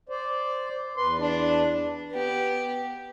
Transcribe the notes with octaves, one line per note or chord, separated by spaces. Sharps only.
C5 D5
E2 B4 C6
D4
B3 G4